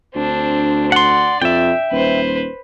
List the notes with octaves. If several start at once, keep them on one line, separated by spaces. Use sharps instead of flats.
D2 C4 D4
D5 F#5 C6
F2 E5 G5
D#1 B4 C5